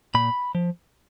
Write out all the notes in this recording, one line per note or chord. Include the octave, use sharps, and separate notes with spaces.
A#2 B5
F3